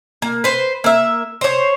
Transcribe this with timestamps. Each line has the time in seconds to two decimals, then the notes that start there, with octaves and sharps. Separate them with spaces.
0.22 A#3
0.44 B4 C5
0.84 A#3 E5
1.41 C5 C#5